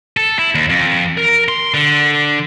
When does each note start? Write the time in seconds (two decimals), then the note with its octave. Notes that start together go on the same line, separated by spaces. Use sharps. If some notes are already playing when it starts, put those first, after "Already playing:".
0.17 A4
0.39 E4
0.55 D#2
0.70 F2
1.17 A#4
1.49 C6
1.74 D3